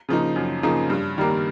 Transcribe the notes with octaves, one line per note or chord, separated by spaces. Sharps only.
C#3 F3 A#3 D#4
F#2
C#3 F3 A#3 D#4
G2
D#3 G3 A#3